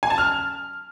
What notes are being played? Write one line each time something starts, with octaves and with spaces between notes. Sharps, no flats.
G#5
A5
F6